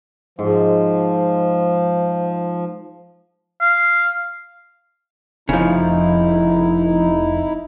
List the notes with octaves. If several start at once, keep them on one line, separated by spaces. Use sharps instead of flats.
G#2 F3
F5
F1 C#3 F3 D#4 E4